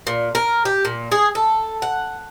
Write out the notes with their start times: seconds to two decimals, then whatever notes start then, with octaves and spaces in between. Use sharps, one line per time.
0.07 A#2
0.35 A#4
0.65 G4
0.85 A#2
1.12 G#4
1.35 A4
1.82 F#5